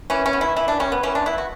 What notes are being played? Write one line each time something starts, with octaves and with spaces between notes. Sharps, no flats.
E3 C#4
C#4
B3
E4
E3 E4
D4
G3 C#4
B3
E3 C#4
D4
B3 E4
F#4